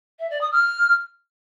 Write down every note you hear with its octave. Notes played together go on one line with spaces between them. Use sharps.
E5
D5
D#6
F6